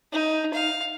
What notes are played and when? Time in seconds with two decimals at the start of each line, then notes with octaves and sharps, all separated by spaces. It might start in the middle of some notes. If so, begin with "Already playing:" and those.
0.13 D#4
0.54 F5